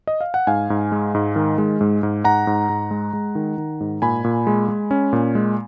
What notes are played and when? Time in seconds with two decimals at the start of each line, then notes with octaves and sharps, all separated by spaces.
0.07 D#5
0.21 F5
0.34 F#5
0.47 G#2 F5 G#5
0.70 G#2
0.92 G#3
1.15 G#2
1.36 D#3
1.58 G#3
1.81 G#2
2.03 G#2
2.24 G#2 F#5 A#5
2.47 G#2
2.69 G#2
2.91 G#3
3.13 G#3
3.35 D#3
3.58 D#3
3.80 G#2
4.02 A#2 G#5 B5
4.24 A#2
4.47 G#3
4.69 G#3
4.91 C#4
5.13 A#2
5.35 G#3